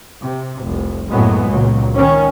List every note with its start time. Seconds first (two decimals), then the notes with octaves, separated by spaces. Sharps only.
0.22 C3
0.63 F1 C2
1.10 F#2 A2 F#3 G#3 A#3 B3
1.47 C#2 A#2 F#3
1.94 D#3 C#4